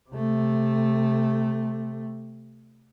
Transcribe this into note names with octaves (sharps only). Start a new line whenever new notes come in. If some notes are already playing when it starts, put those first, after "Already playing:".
C3 A3